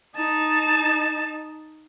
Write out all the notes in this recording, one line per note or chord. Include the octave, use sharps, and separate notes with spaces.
D#4 A5